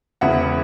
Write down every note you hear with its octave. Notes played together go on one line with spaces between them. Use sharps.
E1 E2 C#3 E5 F#5